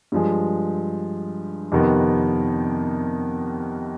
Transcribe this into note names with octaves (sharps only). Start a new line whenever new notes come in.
G2 F3 G#3
F2 C3 D#3 B3